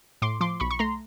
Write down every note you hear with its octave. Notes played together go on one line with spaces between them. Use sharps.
A2 C6 D6
F3 C6 D6
B1 B5 C#6
C#6
A3 A#5 C6